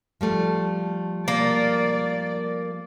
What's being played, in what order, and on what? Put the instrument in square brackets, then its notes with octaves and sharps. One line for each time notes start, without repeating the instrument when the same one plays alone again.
[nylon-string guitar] F3 G3 A3
[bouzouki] A#3 [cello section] D5